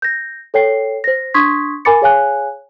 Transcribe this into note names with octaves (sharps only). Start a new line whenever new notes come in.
G6 A#6
A4 C#5 G5 C7
C5 A#6
D4 C6 C#6 D#6 G#6 B6
A#4 G#5 B5 D6 A6 C#7
G#4 C#5 F5 G#5 F#6